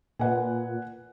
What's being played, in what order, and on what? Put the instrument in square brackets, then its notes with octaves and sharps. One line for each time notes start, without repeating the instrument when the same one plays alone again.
[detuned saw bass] A#2 [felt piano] B4 F#5 G#5